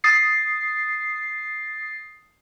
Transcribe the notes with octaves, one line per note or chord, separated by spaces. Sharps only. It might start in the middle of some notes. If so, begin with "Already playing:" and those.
D#6 A6 C7